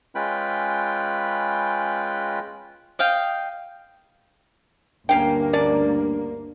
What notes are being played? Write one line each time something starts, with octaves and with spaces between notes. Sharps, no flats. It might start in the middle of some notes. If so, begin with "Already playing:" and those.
G#3 C#4 F4 B4 G5 B5
D#5 F5 G5
D2 G2 A#3 C#4 F5 G5
C#4 D4 D5